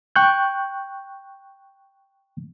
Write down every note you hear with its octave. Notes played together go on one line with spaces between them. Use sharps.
G5 C#6 F#6 G6